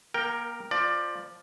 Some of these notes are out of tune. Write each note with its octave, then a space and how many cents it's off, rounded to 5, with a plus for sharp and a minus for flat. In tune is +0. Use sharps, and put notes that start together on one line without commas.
A#3 +30 A#4 +0 G5 +0
F3 +5 D5 +20